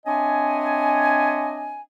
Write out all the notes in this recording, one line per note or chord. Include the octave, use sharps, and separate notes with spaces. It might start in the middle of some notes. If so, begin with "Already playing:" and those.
C4 D4 C#5 D#5 E5 G#5